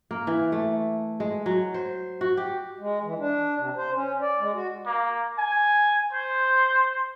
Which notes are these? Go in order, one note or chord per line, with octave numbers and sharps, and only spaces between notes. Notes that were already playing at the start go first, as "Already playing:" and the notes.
A#3
E3
A3
G#3
F#3
C5
F#4
G4
G#3
E3
D4
C3
C5
C#4
D5
G#3
F#4
A#3
G#5
C5